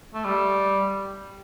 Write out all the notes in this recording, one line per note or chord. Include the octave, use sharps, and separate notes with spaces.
A3
G3